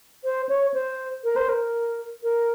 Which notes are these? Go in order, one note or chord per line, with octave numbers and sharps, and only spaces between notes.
C5
C#5
C5
A#4
C5
A#4
A#4